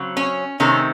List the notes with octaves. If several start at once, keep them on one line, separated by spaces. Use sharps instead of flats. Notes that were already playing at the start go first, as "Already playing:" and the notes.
Already playing: C#3 F#3 C4
C#4
C3 D#3 A3 C4 C#4